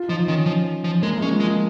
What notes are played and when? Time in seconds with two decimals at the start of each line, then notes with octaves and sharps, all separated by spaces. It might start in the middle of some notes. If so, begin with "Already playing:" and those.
Already playing: F4
0.08 F3 D#4
0.28 D#3 C#4
0.46 F3
0.84 F3
1.03 G#3 A#3
1.17 G#3
1.22 C#4
1.31 F3
1.40 G#3
1.45 F3